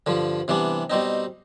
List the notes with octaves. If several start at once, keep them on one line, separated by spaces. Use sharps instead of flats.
G2 D3 F3
C3 E3 G3 B3 D4
B2 G3 C4 D#4